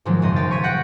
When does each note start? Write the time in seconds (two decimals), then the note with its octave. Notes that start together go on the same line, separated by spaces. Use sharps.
0.05 G#2 D#3 F3 F#3 G#3 A#3
0.22 D#1 F#2 C#3 D#5 C6
0.36 F5 G5 A6
0.50 C#6 G#6 B6 D#7
0.63 F#5 G5 G6 A#6 C#7